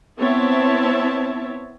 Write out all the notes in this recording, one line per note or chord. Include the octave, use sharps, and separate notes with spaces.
B3 C4 E4 C#5 E5 A5